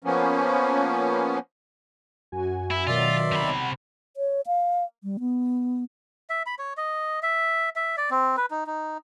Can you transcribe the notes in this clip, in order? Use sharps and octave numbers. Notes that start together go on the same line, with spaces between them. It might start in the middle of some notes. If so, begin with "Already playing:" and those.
F3 A#3 B3 C#4
F#2 F#4 G#5
E4 E5
B2 D#3 F#3 F4 D5 E5 C6
C3 B5
F#5
C#5
F5
G3
B3
E5
B5
C#5
D#5
E5
E5
D5
C4
B4
D#4
D#4